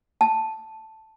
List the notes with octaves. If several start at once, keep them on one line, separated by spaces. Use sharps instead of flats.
A5